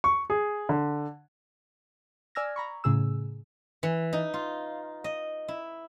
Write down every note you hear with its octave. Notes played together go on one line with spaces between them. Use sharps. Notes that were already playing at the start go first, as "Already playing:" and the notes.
C#6
G#4
D3
D5 G#5 E6 F6 G#6 A#6
A#5 B5 C#6
A2 C#3 G#4 E6
E3
D#4
F4
D#5
E4